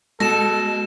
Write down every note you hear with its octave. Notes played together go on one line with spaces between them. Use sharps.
B2 G#3 A4 A#6 E7